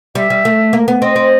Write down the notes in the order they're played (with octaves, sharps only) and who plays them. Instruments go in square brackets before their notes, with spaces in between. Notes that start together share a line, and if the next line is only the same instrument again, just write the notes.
[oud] G3 [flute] E5
[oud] G3
A3
A#3
B3
[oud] C4 [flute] D#5
[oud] C4